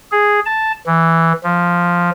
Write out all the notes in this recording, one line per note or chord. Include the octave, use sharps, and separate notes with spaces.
G#4
A5
E3
F3